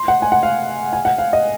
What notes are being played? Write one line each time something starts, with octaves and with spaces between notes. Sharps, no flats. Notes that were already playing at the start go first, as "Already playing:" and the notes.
Already playing: C6
F#5
G#5
F#5
F5
G#5
F#5
F5
D#5